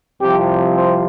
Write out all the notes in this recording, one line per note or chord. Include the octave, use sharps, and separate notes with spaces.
C2 C3 F3 G4
C5